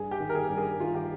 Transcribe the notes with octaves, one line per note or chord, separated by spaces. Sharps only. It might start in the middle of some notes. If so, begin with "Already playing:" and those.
Already playing: G2 G#4
G4
D#3
A#4
G#4
G2
G#4
D#3 F4
G4